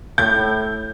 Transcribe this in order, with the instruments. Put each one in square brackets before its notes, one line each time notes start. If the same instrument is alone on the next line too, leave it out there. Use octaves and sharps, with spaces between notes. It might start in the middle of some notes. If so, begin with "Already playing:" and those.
[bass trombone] A2 [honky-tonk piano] G6